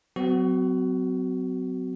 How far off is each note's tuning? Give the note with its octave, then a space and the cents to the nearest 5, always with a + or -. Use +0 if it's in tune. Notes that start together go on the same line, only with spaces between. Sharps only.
F#3 +0 C4 -45 F#4 +20